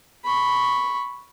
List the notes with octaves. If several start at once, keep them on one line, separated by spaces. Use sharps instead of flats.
B5 C#6